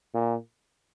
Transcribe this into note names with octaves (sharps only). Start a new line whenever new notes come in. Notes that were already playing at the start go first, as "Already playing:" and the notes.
A#2